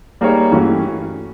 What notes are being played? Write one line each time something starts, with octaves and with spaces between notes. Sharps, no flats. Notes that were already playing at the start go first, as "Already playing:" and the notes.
G3 A#3 D#4 G#4 C#5
G2 E3 A3 C#4 F#4